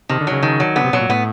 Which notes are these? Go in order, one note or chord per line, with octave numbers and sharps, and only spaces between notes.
C3 D#3
D3
C#3 F#3
D#3
F#3
D3 B3
C3
B2 F#3
A#2
A2 B3